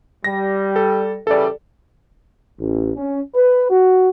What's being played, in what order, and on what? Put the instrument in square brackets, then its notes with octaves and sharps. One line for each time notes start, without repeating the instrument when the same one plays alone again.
[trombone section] G3 [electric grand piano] A#6
[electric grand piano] A4
[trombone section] C#3 E3 G3 [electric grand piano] A4 D5
[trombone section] A1
C#4
B4
F#4